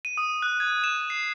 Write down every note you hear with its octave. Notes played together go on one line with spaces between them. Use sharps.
D#7
D#6
F#6
G#6
E7
C7